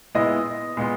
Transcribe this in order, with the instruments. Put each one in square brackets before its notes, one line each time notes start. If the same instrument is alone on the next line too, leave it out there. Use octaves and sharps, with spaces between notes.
[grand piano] A#2 G#3 B3 E4 [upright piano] D#5
[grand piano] A#2 G#3 B3